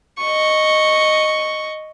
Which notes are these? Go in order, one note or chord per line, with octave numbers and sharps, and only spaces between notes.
D#5 C#6